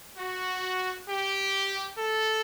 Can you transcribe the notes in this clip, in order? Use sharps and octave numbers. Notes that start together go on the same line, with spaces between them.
F#4
G4
A4